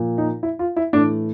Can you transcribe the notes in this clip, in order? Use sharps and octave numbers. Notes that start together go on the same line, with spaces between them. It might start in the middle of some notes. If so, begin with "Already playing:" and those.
Already playing: A#2 F3
D#4
E4
F4
E4
A2 E3 D4